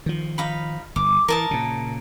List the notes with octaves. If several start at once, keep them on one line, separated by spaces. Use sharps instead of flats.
D#3 F3
D#4 F5 B5
G1 D6
E3 A#4 A5 D#6
A#2 C#3